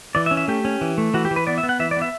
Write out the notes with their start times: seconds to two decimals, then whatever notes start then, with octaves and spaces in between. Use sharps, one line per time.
0.15 E3 D5
0.26 E5
0.31 C#4
0.37 E5
0.48 A3 G4
0.65 C#4
0.81 E3
0.98 A3
1.14 E3 F#4
1.25 G4
1.31 E3
1.36 B4
1.47 B3 D5
1.58 E5
1.63 B3
1.69 F#5
1.79 E3 E5
1.91 D5
1.97 B3
2.02 E5